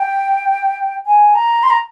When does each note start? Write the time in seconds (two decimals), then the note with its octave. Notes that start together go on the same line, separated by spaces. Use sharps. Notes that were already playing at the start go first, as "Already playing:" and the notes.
Already playing: G5
1.06 G#5
1.35 A#5
1.63 C6
1.70 A#5